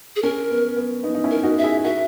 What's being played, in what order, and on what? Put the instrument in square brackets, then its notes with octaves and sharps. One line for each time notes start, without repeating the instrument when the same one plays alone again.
[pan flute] G#4
[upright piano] C#4 [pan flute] A#4
[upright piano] B3
B3
B3 D#4
D#4
C#4 E4
[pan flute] A#4
[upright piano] D#4 F#4
[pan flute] E5
[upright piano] E4 G#4
[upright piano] F#4 A#4 [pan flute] E5